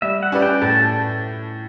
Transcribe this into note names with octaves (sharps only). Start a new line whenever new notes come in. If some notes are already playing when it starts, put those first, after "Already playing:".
G3 E5
F#5
C#4 G4 B4 D5
G5
A2 A5